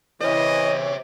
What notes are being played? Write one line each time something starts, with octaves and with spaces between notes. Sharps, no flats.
E3 C5 C#5 D#5 E5